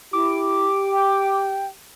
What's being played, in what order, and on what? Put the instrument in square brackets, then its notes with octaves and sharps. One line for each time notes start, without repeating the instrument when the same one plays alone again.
[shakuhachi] E4 [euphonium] G4 [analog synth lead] D6
[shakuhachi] G5